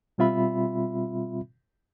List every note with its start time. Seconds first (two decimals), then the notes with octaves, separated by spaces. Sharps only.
0.18 B2 G3 C4 F4 E5 B5